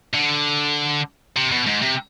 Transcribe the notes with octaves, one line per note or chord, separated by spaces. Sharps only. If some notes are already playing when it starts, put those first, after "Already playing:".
D3
C3
B2
G#2
C3